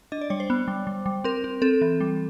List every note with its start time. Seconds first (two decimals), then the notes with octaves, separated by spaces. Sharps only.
0.12 D4 D#5
0.21 D5
0.30 G3 C#5
0.40 C5
0.50 B3
0.68 G3
0.87 G3
1.06 G3
1.24 C4 A#4
1.44 C4
1.62 C4 A4
1.82 E3
2.01 G3